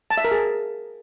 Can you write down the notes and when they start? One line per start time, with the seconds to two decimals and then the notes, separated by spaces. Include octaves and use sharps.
0.11 A5
0.17 E5
0.24 A#4
0.31 G#4